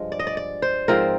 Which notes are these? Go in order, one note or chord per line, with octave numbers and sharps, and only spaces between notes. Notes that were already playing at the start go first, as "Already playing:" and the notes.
Already playing: G2 F3 G#3
D5
D#5
D5
D5
C5
G#2 F3 C4 A#4